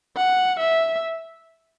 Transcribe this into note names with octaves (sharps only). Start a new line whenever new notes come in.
F#5
E5